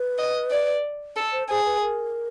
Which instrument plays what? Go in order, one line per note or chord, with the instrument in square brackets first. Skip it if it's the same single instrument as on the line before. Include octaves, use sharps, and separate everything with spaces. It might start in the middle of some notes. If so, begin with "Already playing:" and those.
Already playing: [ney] B4
[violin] D#5
D5
A4
[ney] C5
[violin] G#4 [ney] C5
[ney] B4
A#4